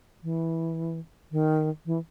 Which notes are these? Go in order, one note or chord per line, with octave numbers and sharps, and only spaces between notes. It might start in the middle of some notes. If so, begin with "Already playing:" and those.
E3
D#3
E3